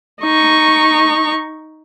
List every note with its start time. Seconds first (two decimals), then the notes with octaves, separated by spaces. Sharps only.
0.22 D#4 C#6